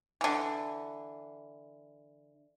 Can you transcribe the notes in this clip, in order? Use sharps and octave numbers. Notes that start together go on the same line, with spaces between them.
D3 E3